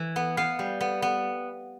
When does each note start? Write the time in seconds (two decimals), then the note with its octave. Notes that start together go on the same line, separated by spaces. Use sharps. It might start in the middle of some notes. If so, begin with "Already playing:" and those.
Already playing: E3
0.16 B3
0.37 B3 F5
0.59 G3
0.81 B3
1.02 B3